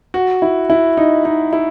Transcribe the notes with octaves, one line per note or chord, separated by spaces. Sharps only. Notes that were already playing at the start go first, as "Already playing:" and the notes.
F#4
E4
E4
D#4
D#4
E4